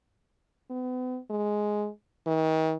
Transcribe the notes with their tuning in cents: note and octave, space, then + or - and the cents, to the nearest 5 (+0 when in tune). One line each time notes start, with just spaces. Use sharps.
B3 +40
G#3 +5
D#3 +40